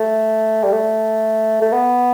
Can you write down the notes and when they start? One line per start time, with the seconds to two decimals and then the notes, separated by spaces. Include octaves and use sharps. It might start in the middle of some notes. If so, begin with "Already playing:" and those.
Already playing: A3
0.63 G3
0.72 A3
1.62 A3
1.73 B3